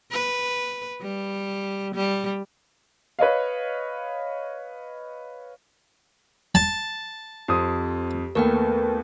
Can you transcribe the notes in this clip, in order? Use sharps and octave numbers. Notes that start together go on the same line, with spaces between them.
B4
G3
G3
B4 C#5 D#5 F5
A5
F2 C4 G4 D#6
D#2 A3 B3 A#4 B4 G5